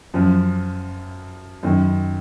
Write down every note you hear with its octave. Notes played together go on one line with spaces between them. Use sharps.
F#2 F3
F#2 D#3